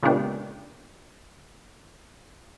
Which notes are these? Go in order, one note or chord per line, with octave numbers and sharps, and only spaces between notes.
A#2 C#3 G#3 B3 D4 G4